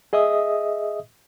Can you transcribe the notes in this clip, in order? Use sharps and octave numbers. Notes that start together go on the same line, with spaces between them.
G#4 D#5 E5 D#6